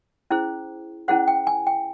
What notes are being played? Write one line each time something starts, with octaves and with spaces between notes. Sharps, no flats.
C#4 E4 G#4 C5
C#4 E4 G#4 C5 F#5
G5
G#5
G5